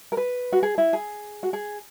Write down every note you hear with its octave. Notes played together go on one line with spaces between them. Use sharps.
A#4
B4
F#4
G#4
E4
G#4
F#4
G#4